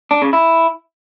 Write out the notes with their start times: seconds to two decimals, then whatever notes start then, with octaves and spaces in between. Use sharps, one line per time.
0.11 D4
0.22 C#3
0.33 E4